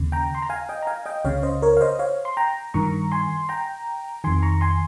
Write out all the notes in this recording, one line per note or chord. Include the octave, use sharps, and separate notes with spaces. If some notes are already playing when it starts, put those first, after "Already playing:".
Already playing: D#2 C#3
G5 A#5
C6
A#5
F5 G#5
D#5 G5
A#5
F5 G#5
D#5 G5
C#2 C#3 C#5 F5
C5 D#5
A#4 C#5
F5
C5 D#5
C#5 F5
C6
G5 A#5
G2 D#3 A#5 C#6
G#5 C6
G5 A#5
F2 D#3 G#5 C6
A#5 C#6
G#5 C6